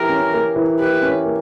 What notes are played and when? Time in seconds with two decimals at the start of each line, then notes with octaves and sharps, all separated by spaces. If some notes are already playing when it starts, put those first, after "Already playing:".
Already playing: E3 A#3 G4 A#4
0.09 C#4
0.34 A#3
0.56 E3
0.80 G4 B4
1.02 C#4
1.26 A#3